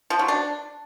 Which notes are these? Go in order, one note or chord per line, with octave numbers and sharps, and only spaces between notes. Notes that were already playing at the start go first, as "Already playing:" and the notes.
F3
F#3
D4